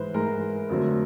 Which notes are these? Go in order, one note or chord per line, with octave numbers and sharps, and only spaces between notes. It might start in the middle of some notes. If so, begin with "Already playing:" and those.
Already playing: G#2 E3 G#3 B4 C5
G#2 E3 G#3 A#4
F2 D3 F#3 A3